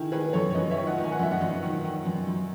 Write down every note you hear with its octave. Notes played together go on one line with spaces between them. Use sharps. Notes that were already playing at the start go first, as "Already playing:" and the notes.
Already playing: D#3 E4 G#4
D#3 G#4 B4
F#2 A4 C#5
C#5
F#2 B4 D#5
C#5 E5
D#3
D#5 F#5
D#3
G#5
F#5
F#2 E5
D#5 F#5
F#2
D#3
D#3
F#2
F#2